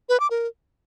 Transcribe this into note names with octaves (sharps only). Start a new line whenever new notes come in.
B4
D6
A#4